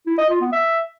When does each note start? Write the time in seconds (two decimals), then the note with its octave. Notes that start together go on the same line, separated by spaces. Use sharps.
0.06 E4
0.18 D#5
0.29 F4
0.41 B3
0.52 E5